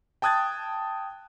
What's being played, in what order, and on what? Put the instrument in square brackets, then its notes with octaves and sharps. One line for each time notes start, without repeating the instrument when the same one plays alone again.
[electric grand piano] G5 A5 D#6 F#6 G#6 A6